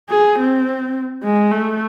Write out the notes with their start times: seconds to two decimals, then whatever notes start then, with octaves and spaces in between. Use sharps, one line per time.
0.10 G#4
0.39 C4
1.23 G#3
1.51 A3